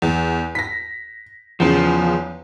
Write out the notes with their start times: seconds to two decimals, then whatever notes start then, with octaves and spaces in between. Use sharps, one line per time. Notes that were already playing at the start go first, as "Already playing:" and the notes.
0.02 E2
0.55 A#6 B6
1.60 E2 C#3 F3